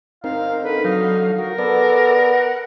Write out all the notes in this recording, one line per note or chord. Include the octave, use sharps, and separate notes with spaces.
C4 D#4 A#4 F5
D3 B4
F#3 D#4 F5
F#4 A#4
B3 A4 D5
F#5